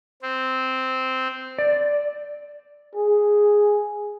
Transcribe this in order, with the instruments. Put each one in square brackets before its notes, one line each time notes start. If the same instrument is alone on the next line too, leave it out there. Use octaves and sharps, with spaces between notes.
[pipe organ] C4
[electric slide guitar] D5
[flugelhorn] G#4